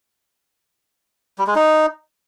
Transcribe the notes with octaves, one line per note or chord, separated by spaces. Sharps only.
G3
G#3
D#4